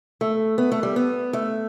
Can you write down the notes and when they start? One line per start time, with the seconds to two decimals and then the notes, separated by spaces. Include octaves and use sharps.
0.21 A3
0.58 B3
0.72 A3
0.83 G3
0.96 B3
1.33 A3